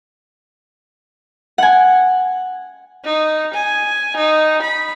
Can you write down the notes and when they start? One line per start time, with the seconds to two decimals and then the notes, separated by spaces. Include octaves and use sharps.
1.58 F#5 G#5
3.04 D#4
3.54 G#5
4.17 D#4
4.62 B5